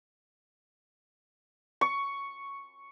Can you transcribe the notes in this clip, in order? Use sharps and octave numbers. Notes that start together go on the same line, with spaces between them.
C#6